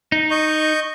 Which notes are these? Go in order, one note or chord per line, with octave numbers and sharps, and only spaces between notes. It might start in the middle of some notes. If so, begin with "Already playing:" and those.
D#4
D#5 C#6 G6